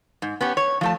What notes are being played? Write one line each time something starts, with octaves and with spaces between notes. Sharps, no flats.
G#2
B3 C#4 G4
C#5
F3 A3 A5